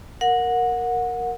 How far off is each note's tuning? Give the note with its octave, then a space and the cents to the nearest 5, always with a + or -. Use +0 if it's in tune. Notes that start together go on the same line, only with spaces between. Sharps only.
A#4 +0 F#5 -20